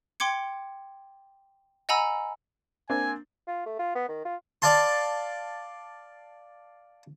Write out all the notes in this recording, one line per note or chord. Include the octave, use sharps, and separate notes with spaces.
G5 C6 D6 G#6 C#7
D#5 F#5 G#5 A#5 B5 E6
A#3 C4 D4 G#5
F4
A3
F4
B3
D#3
F4
D5 F5 A5 C6